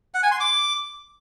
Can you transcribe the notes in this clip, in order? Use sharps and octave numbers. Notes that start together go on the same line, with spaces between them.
F#5
G#5
C6
D6